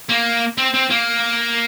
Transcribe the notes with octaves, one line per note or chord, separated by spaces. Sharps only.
A#3
C4
C4
A#3